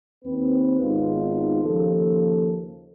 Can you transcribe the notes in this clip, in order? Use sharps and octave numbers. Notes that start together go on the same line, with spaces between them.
D#2 C4 B4
G#1 D#3 G#3 B3 D#4 F4
D#2 C#3 F3 A#3 A4